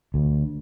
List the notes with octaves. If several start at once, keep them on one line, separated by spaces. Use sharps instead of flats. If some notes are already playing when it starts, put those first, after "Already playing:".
D2